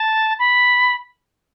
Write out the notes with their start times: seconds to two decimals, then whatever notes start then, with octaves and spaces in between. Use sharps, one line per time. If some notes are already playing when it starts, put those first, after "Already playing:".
Already playing: A5
0.39 B5